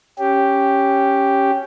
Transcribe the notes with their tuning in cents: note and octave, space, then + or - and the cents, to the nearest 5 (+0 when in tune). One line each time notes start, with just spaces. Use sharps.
C#4 +0 G4 +0